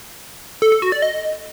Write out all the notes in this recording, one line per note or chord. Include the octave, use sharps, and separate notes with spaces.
A4
A4
F#4
D5
D#5